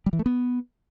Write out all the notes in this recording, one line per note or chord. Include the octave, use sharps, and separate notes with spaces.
G3
E3
A3
B3